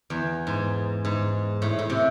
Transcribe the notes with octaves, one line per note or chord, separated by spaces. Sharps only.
E2
G#2
G#2
A2
A2
C3